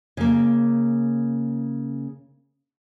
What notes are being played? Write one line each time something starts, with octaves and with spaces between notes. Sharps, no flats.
C#3 A#3